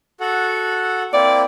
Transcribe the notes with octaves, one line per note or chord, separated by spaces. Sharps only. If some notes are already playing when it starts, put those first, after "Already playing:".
F#4 A4 F#5
A#3 C4 E4 D5